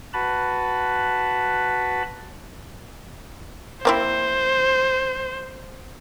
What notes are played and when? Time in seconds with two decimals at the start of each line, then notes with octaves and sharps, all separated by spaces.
0.13 F#4 B4 A5 B5
3.85 A#3 C4 E4 C5